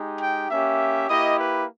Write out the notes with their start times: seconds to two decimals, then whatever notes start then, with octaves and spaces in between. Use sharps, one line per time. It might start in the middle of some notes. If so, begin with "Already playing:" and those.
Already playing: G#3 D#4 G4
0.21 G5
0.50 A#3 C#4 G4 E5
1.08 A#3 E4 G4 D#5
1.37 B4